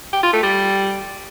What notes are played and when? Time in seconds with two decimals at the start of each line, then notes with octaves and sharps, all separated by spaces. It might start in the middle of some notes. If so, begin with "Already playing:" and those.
0.13 G4
0.23 F4
0.33 A3
0.43 G3